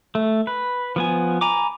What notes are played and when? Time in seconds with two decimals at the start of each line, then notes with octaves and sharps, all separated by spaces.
0.15 A3
0.47 B4
0.96 F3 B3 G#5
1.41 G#5 A#5 B5 D6